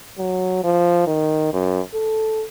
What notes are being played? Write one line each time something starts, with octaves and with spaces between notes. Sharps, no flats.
F#3
F3
D#3
F#2
A4